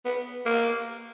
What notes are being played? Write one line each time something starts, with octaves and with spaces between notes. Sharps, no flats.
B3
A#3